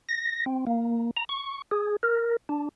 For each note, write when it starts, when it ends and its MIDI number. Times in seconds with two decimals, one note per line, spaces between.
0.09 0.45 94
0.46 0.65 60
0.67 1.11 58
1.17 1.25 82
1.29 1.62 85
1.71 1.96 68
2.03 2.36 70
2.49 2.69 62